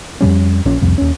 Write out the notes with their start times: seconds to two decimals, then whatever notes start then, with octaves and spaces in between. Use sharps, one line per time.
0.21 F2 G#2 G3 C#4
0.66 A#1 A#2 C#4
0.81 C2 F2
0.98 D#2 C#4